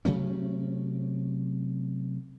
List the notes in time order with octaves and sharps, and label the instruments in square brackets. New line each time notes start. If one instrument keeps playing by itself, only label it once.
[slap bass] C3 F#3 A3 C#4